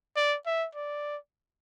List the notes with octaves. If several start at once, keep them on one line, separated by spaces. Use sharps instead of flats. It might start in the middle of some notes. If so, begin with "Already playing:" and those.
D5
E5
D5